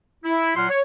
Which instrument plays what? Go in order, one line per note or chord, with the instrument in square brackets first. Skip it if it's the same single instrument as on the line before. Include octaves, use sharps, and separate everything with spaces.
[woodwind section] E4
A#2 F#3 F4 F#5 C6 F6
C#5